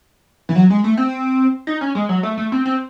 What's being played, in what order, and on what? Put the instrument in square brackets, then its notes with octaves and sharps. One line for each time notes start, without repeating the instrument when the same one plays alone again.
[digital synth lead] E3
F#3
G#3
A3
C4
D#4
C#4
G#3
F#3
A3
A3
C4
C4